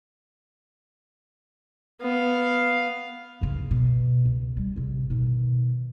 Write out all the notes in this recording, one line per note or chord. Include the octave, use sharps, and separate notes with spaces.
B3 F5
D#2 C#3
B2
C#2
G3
A1 C3
B2 D#3